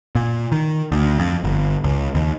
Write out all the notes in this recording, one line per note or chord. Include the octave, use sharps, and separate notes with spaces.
A#2
D#3
D2
F2
G1
C#2
D#2